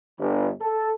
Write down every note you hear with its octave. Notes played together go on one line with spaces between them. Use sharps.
G1
A4